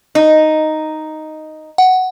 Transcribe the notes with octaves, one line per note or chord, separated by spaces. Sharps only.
D#4
F#5